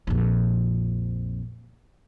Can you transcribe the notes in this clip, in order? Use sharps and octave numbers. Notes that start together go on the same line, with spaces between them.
A#1 F2